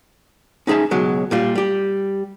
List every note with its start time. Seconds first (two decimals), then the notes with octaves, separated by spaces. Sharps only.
0.67 C#4 D#4 G#4 E5 A5
0.91 C#2 B2 F#3 G#3
1.31 A#2 G3 F4
1.56 G3 G4